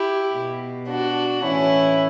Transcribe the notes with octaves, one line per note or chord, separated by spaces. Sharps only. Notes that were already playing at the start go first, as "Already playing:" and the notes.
Already playing: E4 G4
B2
D4 F#4
A2 E3 C#4 E4